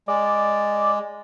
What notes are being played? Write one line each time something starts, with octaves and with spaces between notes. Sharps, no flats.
G#3 D5